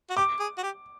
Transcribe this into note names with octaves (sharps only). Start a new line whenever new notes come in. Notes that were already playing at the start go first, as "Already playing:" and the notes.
F#4
G4 D6
G#4
F#4
G4